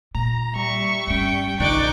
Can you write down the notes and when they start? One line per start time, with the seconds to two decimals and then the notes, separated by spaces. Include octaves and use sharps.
0.15 A#2 A#5
0.56 G3 E5 C#6
1.07 G1 C#4 G5
1.60 A#1 D3 D#4 D5 G5 C#6 D6 F#6